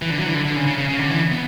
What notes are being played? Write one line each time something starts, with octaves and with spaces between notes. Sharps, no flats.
E3
D3
F#3
E3
D3
D3
C#3
C#3
C#3
C#3
D3
E3
B3